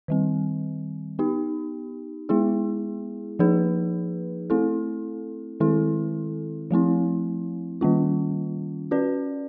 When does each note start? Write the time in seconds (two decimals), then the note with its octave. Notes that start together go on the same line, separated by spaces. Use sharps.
0.08 D#3 G3 C4
1.19 B3 D#4 G4
2.29 G#3 B3 E4 G#4
3.39 F3 A#3 D#4 G#4 B4
4.50 A3 C4 E4 A4
5.60 D#3 G#3 C4 E4 A4
6.71 F3 A3 C4 E4
7.81 D#3 G3 A#3 C#4 F4
8.91 C#4 F#4 B4 D5